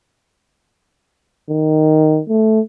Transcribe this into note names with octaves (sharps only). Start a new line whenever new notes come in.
D#3
A3